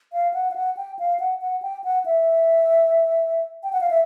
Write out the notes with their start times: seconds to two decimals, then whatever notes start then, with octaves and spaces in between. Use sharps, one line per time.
0.13 F5
0.34 F#5
0.51 F5
0.56 F#5
0.77 G5
0.99 F5
1.20 F#5
1.41 F#5
1.62 G5
1.84 F#5
2.06 E5
3.63 G5
3.73 F#5
3.81 F5
3.90 E5